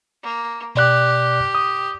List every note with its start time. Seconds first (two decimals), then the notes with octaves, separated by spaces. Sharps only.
0.23 A#3
0.75 B2 G4 D5 F#6
1.55 D#6